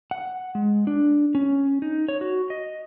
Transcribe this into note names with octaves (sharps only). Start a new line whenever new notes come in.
F#5
G#3
D4
C#4
D#4
C#5
F#4
D#5